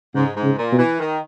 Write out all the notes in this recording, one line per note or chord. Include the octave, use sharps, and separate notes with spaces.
G#2 C#3
G#2
C#3
A#2
B2
E3
D#3